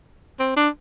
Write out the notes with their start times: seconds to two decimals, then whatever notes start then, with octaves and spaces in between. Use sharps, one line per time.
0.39 C4
0.56 D4